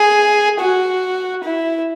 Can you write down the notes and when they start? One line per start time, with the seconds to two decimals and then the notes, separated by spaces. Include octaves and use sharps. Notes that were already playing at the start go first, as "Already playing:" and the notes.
Already playing: G#4
0.60 F#4
1.44 E4